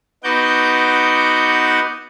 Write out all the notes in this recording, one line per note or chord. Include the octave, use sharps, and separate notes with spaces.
B3 D#4 F#4 F#5 D6 G6